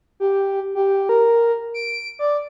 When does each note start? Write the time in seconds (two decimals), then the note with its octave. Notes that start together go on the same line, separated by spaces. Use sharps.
0.20 G4
0.75 G4
1.09 A#4
1.74 D7
2.19 D5